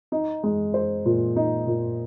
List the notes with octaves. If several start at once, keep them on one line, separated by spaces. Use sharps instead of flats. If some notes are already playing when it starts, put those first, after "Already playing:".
D#4
G#3
C5
A#2
D#4
A#2